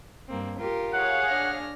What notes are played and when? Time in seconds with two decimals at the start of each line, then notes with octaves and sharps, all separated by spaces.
0.29 G2 A#3 C4
0.59 F4 G4 A#4
0.93 G#4 C#5 F5 F#5
1.26 D4 F6 A#6